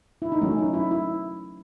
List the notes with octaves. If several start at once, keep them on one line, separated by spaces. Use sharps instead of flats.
E4
D#4
F#3 A3 C#4
D#4
E4
E4